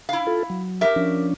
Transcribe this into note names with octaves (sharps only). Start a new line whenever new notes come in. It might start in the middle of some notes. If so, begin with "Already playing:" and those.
E4 F5
F4 A4
F#3
G4 A#4 E5
F3 C#4 D4